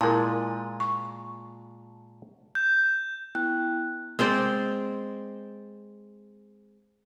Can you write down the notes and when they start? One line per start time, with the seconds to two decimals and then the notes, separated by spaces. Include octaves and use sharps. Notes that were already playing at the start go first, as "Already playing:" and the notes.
0.01 A#2 G#3 E4 A#4 A5
0.80 C#6
2.55 G6
3.35 B3 E4 G5 F#6
4.19 G#3 C4 C5 D5